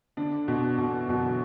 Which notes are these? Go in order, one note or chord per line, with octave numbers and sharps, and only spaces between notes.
D3 D4
B2
B2 E3
F#2 B2 F#3